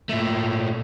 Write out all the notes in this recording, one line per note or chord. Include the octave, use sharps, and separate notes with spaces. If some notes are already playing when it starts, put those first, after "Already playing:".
A#2 A3